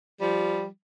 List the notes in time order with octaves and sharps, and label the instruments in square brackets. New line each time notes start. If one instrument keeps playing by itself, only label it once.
[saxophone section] F3 G3